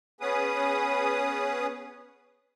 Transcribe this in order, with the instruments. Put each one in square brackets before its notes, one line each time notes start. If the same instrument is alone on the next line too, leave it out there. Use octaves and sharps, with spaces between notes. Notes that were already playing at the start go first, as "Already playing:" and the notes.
[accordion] B3 C#4 G#4 B4 D#6